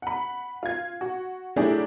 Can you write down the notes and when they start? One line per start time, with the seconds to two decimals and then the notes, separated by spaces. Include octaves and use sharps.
0.02 F#5 B5
0.63 F4 G#6
1.01 F#4
1.56 F#3 A3 D4 E4 G4 G#4